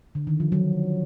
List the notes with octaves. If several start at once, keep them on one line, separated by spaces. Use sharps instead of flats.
D3
D#3
F3
F#3